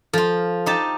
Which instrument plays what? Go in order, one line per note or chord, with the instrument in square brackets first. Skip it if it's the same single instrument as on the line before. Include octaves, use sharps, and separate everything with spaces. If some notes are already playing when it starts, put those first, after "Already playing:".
[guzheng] F3 F4 [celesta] A4
[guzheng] D#4 G4 A5